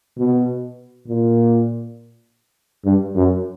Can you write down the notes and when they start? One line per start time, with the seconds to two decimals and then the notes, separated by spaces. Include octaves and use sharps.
0.18 B2
1.08 A#2
2.85 G2
3.15 F#2